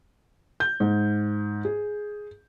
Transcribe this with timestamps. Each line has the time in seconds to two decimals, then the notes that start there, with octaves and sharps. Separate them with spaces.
0.60 G6
0.80 G#2
1.65 G#4